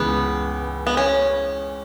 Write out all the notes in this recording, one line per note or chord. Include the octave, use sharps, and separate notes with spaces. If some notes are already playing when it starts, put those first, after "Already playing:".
Already playing: C#2 C#3 E3 B3
B3
C#4